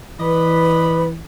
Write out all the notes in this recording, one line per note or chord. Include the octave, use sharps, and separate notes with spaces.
E3 B4 D5 D#5 B5